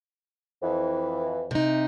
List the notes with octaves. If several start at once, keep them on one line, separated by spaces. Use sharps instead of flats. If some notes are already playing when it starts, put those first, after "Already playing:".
F2 E3
C3 D#4